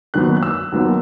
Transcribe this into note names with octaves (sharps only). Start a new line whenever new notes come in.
D#2 D#3 F#3 B3 F#6
F#6
E6
D#2 D#3 F#3 B3